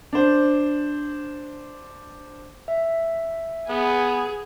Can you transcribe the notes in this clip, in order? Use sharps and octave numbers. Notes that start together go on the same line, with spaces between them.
D4 C5
E5
B3 G#4